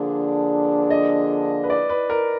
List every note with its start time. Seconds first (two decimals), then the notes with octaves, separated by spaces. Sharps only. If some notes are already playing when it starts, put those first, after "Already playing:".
Already playing: D3 F3 A#3 D4 G#4
0.90 D#5
1.64 B4
1.70 D5
1.90 B4
2.10 A#4